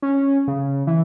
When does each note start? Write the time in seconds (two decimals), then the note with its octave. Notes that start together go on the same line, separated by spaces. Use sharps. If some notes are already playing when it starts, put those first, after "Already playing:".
0.02 C#4
0.48 C#3
0.87 E3